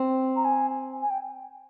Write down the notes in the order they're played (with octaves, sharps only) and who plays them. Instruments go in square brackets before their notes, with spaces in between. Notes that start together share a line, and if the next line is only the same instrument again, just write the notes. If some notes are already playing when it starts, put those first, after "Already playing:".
Already playing: [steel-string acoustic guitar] C4
[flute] A#5
G#5
G#5
G5